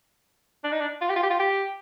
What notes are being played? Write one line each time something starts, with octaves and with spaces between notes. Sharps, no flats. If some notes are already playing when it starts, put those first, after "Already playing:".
D4
D#4
D4
F4
G4
F4
G4
F4
G4